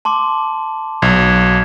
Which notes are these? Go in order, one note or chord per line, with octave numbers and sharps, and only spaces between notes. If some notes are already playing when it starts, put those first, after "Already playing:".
A5 C6 D6
B1 G#6